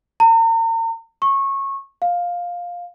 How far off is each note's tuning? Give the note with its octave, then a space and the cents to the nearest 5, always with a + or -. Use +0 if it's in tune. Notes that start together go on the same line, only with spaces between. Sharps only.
A#5 -40
C#6 -20
F5 +10